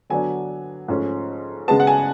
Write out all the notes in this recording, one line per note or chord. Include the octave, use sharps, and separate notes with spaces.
D3 F#3 B3 D4 G#5
G#2 F3 A3 C#4
C#3 G#3 B3 A5
F#5
G#5